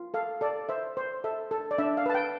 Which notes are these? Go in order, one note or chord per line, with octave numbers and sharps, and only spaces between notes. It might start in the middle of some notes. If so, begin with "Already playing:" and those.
Already playing: F4
A4 F5
A4 D5
C5 E5
C5
A4 E5
A4
D5
D4 E5
F5
B4 A5
G5